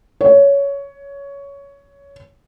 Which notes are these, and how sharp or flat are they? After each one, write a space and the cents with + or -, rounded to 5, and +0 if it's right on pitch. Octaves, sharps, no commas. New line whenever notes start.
C#5 +15